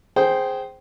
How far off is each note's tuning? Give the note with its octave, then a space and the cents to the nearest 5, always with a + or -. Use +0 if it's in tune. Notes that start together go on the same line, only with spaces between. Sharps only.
G#4 +0 C5 +0 G5 -20